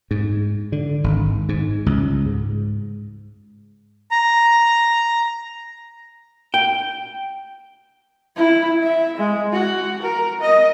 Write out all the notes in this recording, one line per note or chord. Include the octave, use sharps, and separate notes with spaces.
G#2
D3
G#1
G#2
C#2
G#2
A#5
G5
E4
E5
G#3
F#4
A#4
D#5